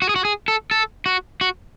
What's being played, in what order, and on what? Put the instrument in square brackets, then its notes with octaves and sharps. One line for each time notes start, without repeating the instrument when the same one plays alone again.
[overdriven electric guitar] F#4
G#4
F#4
G#4
A4
A4
F#4
F#4